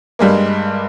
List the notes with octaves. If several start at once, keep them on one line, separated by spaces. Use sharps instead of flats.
G2 G3 G#3 A#3